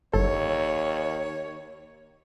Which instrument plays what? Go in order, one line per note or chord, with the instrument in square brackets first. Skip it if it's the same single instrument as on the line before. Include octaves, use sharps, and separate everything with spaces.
[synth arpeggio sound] G1 A4 [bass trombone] D#2 [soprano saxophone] C#5